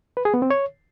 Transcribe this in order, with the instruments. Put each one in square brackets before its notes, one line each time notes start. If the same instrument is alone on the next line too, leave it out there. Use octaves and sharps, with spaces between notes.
[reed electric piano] B4
G#4
B3
C4
C#5